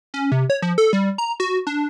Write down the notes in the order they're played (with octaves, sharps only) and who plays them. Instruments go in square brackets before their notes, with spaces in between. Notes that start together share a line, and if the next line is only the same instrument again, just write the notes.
[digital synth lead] C#4
C3
C#5
F3
A4
G3
A#5
F#4
D4